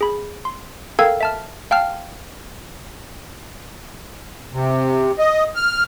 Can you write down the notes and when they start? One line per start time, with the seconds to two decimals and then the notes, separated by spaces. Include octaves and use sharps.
0.01 G#4 B5
0.45 C6
0.99 A4 A#4 F5 G5 E6 G#6
1.21 E5 A5 F6
1.71 F5 G5 A5 F6
4.53 C3
5.19 D#5
5.55 F6